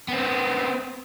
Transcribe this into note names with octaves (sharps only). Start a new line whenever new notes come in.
B3 C4